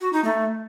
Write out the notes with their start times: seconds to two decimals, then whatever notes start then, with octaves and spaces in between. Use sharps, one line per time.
0.01 F#4
0.13 D#4
0.25 A3